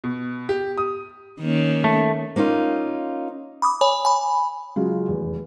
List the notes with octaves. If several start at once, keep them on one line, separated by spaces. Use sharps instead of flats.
B2
G4
D#6
D#3 A#3 C#4
A3
A#3 C#4 D#4 F4
B5 D6 D#6
C#5 G#5 B5
G#5 B5
C#3 F#3 G#3 C#4 F4 F#4
F1 E2